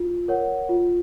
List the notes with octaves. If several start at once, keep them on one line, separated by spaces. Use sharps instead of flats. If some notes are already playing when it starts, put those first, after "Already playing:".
Already playing: F4
A#4 C#5 F#5
F4